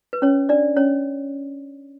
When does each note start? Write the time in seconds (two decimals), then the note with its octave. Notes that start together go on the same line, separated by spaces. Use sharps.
0.13 B4
0.22 C#4 C#5
0.49 D4 D5
0.77 C#4 C#5